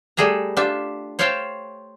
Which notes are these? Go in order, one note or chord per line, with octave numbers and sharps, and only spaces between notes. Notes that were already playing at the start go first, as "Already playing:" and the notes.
G3 A3 G#4 E5 A#5
D4 F4 G4 E5
C5 C#5 E5 F5 G5 A5